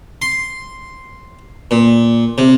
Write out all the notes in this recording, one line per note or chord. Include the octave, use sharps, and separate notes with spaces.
C6
A#2
C3